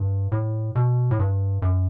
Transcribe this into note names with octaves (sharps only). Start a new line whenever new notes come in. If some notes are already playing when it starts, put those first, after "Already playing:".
Already playing: G2
A2
B2
A2
G2
F#2